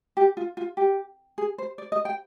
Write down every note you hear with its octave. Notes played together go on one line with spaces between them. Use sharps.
G4
F4
F4
G4
G#4
C5
D5
D#5
G5